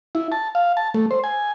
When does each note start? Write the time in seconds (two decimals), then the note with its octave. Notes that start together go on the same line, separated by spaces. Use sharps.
0.15 E4
0.32 A5
0.55 F5
0.77 A5
0.94 A3
1.11 C5
1.24 G#5